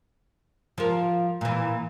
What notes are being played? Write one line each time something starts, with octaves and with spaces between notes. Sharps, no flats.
F3 A#4
A#2 E3